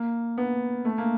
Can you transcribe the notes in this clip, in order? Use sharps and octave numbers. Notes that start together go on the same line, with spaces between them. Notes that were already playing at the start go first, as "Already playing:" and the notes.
Already playing: A#3
B3
A3
A#3